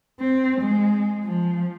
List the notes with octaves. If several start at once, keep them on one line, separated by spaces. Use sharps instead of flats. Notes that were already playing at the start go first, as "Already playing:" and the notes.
C4
G#3
F3